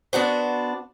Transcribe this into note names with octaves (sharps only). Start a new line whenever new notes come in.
B3 D4 F#4 C5